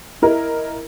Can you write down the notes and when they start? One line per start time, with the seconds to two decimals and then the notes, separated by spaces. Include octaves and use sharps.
0.22 E4 A#4 D#5